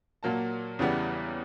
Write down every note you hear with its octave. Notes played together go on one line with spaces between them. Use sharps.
A#2 F#3 A#3 A5
E2 C#3 E3 G3 B3